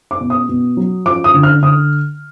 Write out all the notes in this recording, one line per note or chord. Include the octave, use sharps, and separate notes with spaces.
D6
B2
D#6
B2
F#3
F3 D6
D#6
D3
F6
D3 D#6